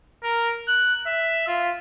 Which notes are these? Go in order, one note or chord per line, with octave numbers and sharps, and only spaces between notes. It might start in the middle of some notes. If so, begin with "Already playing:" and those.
A#4
F#6
E5
F4